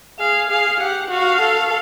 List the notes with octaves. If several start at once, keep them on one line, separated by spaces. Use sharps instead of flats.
G#4 F5
G#4 F5
G4 F#5
F#4 F5
A4